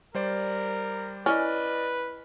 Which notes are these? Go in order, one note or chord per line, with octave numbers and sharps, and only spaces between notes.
G3 A#4 C5 D5
C#4 E4 B4 D5 D#5 F6